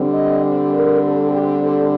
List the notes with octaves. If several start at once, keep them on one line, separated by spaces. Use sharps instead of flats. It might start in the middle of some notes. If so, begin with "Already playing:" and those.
Already playing: D3 G3 C4
D#5
D5
A#4
A4
G4
A4